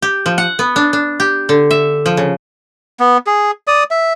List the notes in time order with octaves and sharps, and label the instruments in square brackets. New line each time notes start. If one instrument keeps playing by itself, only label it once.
[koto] G4
F3
F#5
B3
D4
D4
G4
D3
E5
F3
C#3
[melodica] B3
G#4
D5 D#6
E5